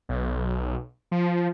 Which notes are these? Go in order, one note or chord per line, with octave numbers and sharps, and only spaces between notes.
B1
F3